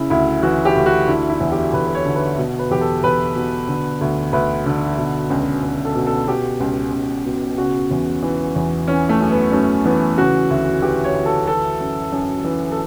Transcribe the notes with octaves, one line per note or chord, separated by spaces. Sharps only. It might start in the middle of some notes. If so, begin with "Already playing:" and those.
Already playing: C#3 E4
D2 E4
E3 F#4
G4
D2
F#4
D3 E4
E4
E2
G4
E2 B4
B4
C#5
D3
B4
B2
B4
E2 G4
A4
E2 B4
B2
D3
D2
D2 B4
D3
B2
C#2
C#2
A4
B2
A4
B2 G4
C#2
C#2
B2
C#3 F#4
E2
E3
E2
E3 C#4
A3
F#2
B3
F#2 A3
E3 B3
C#3 F#4
D2
E3 G4
C#5
D2
A4
E3 A4
F#2
F#2
E3
A4